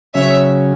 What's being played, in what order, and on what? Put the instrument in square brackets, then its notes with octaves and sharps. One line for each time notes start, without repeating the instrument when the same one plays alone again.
[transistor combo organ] C#3 F#3 C#4 [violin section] C#5 E5